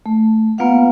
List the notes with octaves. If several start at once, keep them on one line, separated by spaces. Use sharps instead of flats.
A3
A#3 B3 F4 B4 F5 F#5